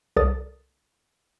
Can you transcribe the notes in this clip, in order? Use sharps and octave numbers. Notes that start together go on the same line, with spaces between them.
C2 A4 A#4 D5 D#6 A6